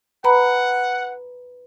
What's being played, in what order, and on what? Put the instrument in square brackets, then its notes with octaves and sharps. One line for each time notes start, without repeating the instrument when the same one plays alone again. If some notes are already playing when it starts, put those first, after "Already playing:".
[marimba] B4 A#5 B5 [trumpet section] F#5